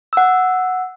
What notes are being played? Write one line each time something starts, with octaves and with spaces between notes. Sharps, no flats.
F#5 E6